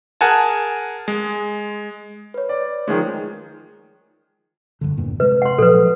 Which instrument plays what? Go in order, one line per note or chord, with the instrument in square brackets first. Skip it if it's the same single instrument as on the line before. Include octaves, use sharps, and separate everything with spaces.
[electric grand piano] G#4 A#4 F#5 G#5 A5
G#3
[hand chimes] B4 C#5
[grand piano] D5
D#3 F3 G#3
[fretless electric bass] E1 G2 D3
E2 G2 A#2
[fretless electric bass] C3 G#3 [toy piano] B4
[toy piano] F#5 C6
[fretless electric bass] A#2 F3 F#3 [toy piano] A4 B4